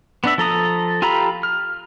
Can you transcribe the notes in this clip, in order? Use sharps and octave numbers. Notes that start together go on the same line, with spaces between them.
B3 D4 E5
F3 A4 A#5 D#6
F4 G4 A4 A#5 B5
F6